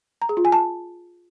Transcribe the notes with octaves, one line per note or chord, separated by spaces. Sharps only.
A#5
G#4
F4
G#5
A5